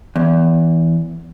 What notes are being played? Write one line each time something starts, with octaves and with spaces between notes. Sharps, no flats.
E2